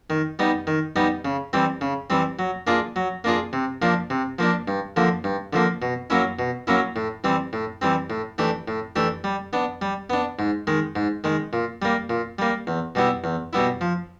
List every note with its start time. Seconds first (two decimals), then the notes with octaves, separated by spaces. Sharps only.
0.10 D#3
0.39 G3 B3 D#4
0.67 D#3
0.96 G3 B3 D#4
1.25 C#3
1.53 E3 G3 C4
1.81 C#3
2.10 E3 G3 C4
2.39 F#3
2.67 A#3 D4 F4 G#4
2.96 F#3
3.24 A#3 D4 F4 G#4
3.53 C3
3.82 F3 A#3 D4
4.10 C3
4.39 F3 A#3 D4
4.68 G2
4.96 D3 F3 A#3
5.24 G2
5.53 D3 F3 A#3
5.82 B2
6.10 F#3 A#3 C#4 E4
6.39 B2
6.67 F#3 A#3 C#4 E4
6.96 A2
7.24 E3 G3 C4
7.53 A2
7.82 E3 G3 C4
8.10 A2
8.38 E3 A3 D4 G4
8.68 A2
8.96 E3 A3 D4 G4
9.24 G3
9.53 B3 D4
9.82 G3
10.10 B3 D4
10.39 G#2
10.67 D#3 G#3
10.96 G#2
11.24 D#3 G#3
11.53 A#2
11.82 G3 A#3
12.10 A#2
12.39 G3 A#3
12.67 E2
12.95 B2 G3 B3 E4
13.24 E2
13.53 B2 G3 B3 E4
13.81 F3